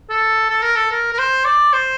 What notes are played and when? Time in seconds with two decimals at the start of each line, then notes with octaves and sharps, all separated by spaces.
0.10 A4
0.50 A4
0.63 A#4
0.76 A4
0.92 A#4
1.13 A#4
1.18 C5
1.45 D5
1.73 C5